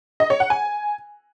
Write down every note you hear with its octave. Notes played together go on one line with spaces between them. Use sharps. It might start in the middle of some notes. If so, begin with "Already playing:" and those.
D#5
C#5
F#5
G#5